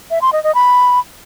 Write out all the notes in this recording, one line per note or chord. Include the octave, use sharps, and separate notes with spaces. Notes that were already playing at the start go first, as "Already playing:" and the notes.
E5
C6
D#5
D#5
B5